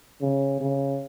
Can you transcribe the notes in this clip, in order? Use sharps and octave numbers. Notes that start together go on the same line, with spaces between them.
C#3
C#3